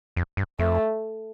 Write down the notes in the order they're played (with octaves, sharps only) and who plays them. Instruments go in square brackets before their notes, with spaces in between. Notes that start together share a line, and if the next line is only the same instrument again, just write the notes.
[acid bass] F2
G2
[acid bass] F2 [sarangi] A3